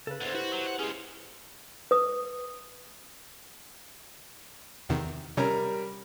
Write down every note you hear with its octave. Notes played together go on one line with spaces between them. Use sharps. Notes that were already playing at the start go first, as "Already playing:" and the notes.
C#3 A4 B4
E2 D3 C5
E4 F#4 G4 B4
F#3
F#5
G#3 C#4 G#4
B4 D#6
E2 C3 D#3
C3 G3 C#4 A#4